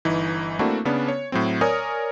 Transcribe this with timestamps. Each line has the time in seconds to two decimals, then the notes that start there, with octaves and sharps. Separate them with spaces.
0.05 G1 E3 D#4
0.59 A3 A#3 C4 D4 E4 F#4
0.85 C#3 B3 C#4 D4
1.08 C#5
1.32 A2 F#3 C4
1.61 A#4 C#5 D5 G#5 D#6